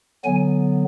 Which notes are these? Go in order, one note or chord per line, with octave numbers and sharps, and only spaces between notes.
D3 F#3 B3 G#5